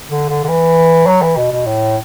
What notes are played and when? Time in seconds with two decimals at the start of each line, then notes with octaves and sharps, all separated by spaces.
0.10 D3
0.29 D3
0.44 D3
0.48 E3
1.07 F#3
1.22 E3
1.37 B2
1.51 B2
1.66 A2